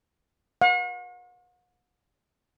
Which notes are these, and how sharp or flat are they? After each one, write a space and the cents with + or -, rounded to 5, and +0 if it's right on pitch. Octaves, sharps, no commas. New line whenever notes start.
F#5 -45